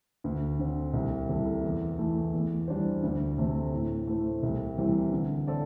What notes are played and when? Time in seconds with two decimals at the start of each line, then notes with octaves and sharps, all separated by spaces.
0.24 D2
0.59 D3 C4
0.93 C2
1.29 C3 G3 E4 A4
1.63 E2
1.98 E3 A3 E4
2.33 E2
2.68 E3 G3 D4 C5
3.03 D2
3.38 C3 A3 C4
3.73 A2
4.07 A3 E4 C5
4.43 C2
4.78 C3 E3 G3 C4
5.12 D3
5.47 C4 A4 D5